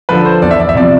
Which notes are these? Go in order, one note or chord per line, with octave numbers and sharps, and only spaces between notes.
D3 F3 B4
C5
E2 D5
E5
D5
E5
C3 F3 D5